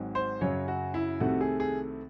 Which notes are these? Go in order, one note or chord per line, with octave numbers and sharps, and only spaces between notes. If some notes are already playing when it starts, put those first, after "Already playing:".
Already playing: G#1 G#2 F#3
C5
F#2 C#3 F#3 C#5
F#4
E4
C2 C3 D#3 A3 F#4
G#4
G#4